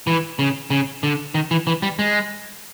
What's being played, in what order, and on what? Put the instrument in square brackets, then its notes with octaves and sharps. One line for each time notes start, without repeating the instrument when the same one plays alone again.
[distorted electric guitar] E3
C#3
C#3
D3
D#3
E3
E3
G3
G#3